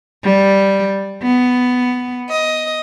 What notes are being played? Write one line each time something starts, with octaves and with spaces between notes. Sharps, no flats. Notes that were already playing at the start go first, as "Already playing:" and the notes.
G3
B3
D#5